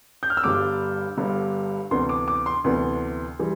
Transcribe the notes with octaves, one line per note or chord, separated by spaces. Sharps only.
G6
F6
E6
G1 G2 D3 G3 D4 D6
G1 G2 D3 G3 D4
D2 C3 E3 B3 D4 C6
D6
D6
C6
D2 C3 E3 B3 D4
E3 G3